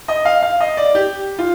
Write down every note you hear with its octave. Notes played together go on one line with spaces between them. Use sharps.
D#5
F5
F5
D#5
D5
G4
F4